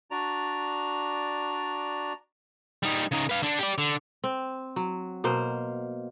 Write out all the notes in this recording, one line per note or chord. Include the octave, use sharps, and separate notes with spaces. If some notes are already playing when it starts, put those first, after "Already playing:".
D4 F#4 D5 A#5
G3 D#4
C#3 D#4
B4 F5
D3 D4
G4 D5
D3
C4
F#3
B2 A#3 C5